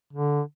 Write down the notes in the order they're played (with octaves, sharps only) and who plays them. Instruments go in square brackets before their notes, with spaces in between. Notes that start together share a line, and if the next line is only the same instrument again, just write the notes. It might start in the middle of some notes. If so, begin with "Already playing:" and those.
[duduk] D3